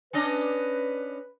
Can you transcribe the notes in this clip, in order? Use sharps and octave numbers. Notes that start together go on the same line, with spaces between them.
C#4 D4 B4 D#5